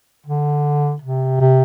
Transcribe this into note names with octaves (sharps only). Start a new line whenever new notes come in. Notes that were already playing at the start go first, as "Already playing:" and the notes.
D3
C3
C3